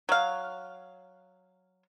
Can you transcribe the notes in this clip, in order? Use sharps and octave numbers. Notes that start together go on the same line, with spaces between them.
F#3 F5